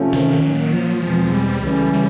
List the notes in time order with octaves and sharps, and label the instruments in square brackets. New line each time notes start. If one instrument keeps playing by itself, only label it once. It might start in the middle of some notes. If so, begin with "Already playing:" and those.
Already playing: [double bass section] C3 F3 A3 C#4
[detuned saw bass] D#3
[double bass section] A#2 F#3 A#3
[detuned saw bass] F3
[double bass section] E2 B2 G#3 C4
[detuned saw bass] G3
[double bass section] C#2 C#3 E3 A3 C#4
[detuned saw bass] G3